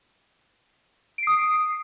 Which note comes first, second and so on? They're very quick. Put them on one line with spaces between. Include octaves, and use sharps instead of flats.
D7 C7 D#6